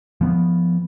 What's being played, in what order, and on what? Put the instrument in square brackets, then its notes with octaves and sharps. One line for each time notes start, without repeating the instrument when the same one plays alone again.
[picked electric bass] F3 B3